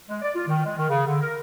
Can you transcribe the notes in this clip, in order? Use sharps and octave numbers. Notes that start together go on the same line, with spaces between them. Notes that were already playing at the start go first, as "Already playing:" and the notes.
G#3
D5
F4
D#3
G#3
D#3
C#3
D3
A#4